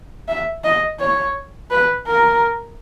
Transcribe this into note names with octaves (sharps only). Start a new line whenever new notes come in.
E5
D#5
C#5
B4
A#4